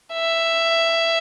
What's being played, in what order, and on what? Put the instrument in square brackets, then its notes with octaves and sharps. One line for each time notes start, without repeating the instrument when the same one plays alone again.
[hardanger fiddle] E5